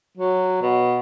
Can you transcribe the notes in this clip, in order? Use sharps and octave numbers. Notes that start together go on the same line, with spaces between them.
F#3
B2